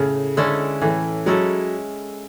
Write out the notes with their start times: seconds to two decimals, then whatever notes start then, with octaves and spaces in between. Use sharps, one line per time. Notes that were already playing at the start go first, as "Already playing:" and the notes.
Already playing: A2 C#3
0.37 D3 G#3 C#4 E4 A4
0.81 A2 E3
1.26 F#3 G#3 C#4 E4 A4